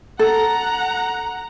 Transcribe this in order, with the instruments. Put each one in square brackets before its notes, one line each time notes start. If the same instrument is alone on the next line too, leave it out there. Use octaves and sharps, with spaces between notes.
[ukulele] A4 [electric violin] F#5 A#5